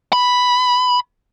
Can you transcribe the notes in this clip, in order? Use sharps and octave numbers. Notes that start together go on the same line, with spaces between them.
B5